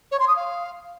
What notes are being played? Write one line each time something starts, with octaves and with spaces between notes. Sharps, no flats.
C#5
C6
D#6
F5